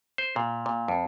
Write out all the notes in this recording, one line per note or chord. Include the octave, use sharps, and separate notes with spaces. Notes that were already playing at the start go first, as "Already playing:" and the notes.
C5
A#2
A#2
F2